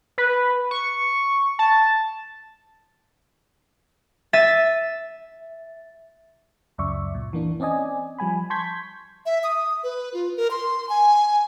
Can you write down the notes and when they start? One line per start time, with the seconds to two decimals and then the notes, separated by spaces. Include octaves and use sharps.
0.18 B4
0.71 C#6
1.59 A5
4.33 E5 A6 D#7
6.78 C#2 F#2 D5 E5 C#6
7.15 A#2
7.33 E3 A#3 D4
7.60 C4 C#4 D5 D#5 G#5
8.19 F3 G3 G#5 B5
8.50 A5 C6 C#6 G6 G#6 B6
9.26 E5
9.44 D#6
9.84 B4
10.14 F4
10.37 A#4
10.51 C6
10.89 G#5